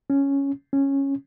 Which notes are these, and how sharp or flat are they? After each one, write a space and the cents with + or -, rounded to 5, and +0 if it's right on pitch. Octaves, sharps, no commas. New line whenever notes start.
C#4 +0
C#4 -10